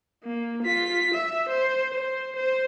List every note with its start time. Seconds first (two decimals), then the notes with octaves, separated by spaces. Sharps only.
0.24 A#3
0.63 F4 B6
1.14 E5
1.49 C5
1.94 C5
2.36 C5